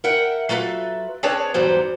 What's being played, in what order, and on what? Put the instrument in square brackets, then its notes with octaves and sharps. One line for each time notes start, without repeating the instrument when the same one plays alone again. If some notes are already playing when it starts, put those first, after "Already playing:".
[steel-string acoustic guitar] A#4 E5 F#5 G5
F#3 F4 A4 B4 E5
C4 D4 G#4 B4 C#5 A5
E2 G#2 F#3 G3 D4 C5